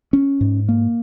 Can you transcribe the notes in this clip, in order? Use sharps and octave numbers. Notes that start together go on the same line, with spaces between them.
C#4
G#2
A#3